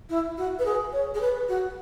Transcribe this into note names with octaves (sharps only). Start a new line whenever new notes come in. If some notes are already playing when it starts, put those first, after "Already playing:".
E4
F#4
B4
G#4
C#5
G#4
B4
F#4